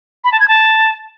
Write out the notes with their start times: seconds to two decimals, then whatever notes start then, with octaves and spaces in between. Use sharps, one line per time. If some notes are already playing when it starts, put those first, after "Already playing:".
0.24 B5
0.32 A5
0.40 G#6
0.48 A5